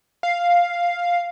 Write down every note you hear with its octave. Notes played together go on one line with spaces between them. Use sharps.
F5